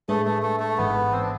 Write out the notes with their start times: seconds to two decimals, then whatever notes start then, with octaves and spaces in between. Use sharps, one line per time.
0.08 A2 G#3 A3 D4 G#4 B4
0.26 A3
0.42 A3
0.60 A3
0.77 G#1 G#2 E3 G#3 B3
1.12 C4
1.22 D4